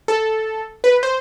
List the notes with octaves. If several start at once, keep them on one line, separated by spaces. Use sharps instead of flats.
A4
B4
C5